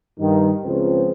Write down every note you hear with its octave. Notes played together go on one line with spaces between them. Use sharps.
G2 D#3
C#2 C#3 F3 C4 B4 C5